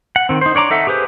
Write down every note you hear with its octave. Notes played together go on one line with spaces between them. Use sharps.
F#5
D#3 C4
D#4 C5
D4 C#5 D5 A#5 D6
D#4 A4 E5 F#5
G4 G#4 B4 C5